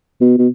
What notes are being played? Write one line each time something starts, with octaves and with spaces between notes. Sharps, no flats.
B2
B2